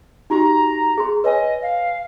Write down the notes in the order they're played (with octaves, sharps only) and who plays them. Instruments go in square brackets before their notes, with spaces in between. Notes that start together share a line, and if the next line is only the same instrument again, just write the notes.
[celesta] D#4 F#4 G4 [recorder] A#5
[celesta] G#4 C6
[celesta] B4 C#5 G#5 [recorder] D#5
[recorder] F5